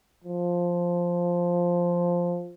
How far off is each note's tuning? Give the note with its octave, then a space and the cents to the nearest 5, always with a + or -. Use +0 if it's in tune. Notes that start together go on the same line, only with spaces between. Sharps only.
F3 +0